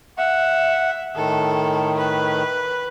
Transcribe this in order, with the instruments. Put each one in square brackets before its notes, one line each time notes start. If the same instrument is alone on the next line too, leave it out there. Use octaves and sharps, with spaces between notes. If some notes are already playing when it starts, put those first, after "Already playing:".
[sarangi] E5 [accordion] F#5
[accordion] A2 D#3 [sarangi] A4
[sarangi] B4